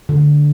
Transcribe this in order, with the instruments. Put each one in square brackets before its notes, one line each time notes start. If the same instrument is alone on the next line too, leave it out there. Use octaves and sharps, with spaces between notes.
[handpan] D3